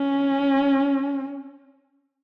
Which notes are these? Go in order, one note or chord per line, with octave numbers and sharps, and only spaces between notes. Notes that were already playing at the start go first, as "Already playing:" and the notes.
Already playing: C#4